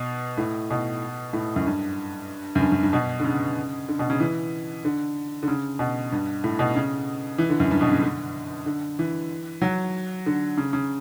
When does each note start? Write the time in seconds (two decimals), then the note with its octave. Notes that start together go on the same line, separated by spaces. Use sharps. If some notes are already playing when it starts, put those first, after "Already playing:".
Already playing: B2
0.38 A2
0.71 B2
1.33 A2
1.56 F#2
1.66 G2
2.55 F#2
2.61 G2
2.72 F#2
2.83 G2
2.93 B2
3.20 D3
3.24 C#3
3.89 D3
3.99 B2
4.10 C#3
4.20 E3
4.85 D3
5.43 D3
5.48 C#3
5.79 B2
6.12 G2
6.44 A2
6.59 B2
6.76 C#3
7.38 E3
7.50 D3
7.60 F#2
7.71 G2
7.81 B2
7.92 C#3
8.03 D3
8.66 D3
8.99 E3
9.62 F#3
10.26 D3
10.58 C#3
10.73 C#3